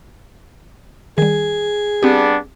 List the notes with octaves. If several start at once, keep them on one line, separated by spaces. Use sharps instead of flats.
D#3 G3 G#4
G3 B3 C4 D4 G4